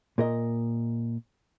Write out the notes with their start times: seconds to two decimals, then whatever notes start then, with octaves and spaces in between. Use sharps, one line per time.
0.18 A#2 A#4 D#5